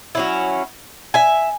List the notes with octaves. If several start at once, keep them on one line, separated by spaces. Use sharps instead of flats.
F#3 C#4 E4
E5 G#5